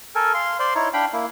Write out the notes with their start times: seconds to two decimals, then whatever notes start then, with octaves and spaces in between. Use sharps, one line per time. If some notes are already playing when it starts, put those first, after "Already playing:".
0.15 A4 A#4 G#5
0.34 F5 C6
0.59 C5 D5 C6
0.75 D#4 E4 C#5
0.94 D4 F5 G5 B5
1.13 A#3 E4